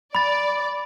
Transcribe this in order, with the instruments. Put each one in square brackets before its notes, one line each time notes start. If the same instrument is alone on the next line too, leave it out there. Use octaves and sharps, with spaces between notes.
[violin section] D5 [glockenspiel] B5 A6